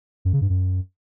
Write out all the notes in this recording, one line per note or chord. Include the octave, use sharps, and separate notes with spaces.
F#2
C#3
G2
F#2